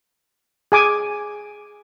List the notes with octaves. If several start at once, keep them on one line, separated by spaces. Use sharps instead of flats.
G#4 G#5 D6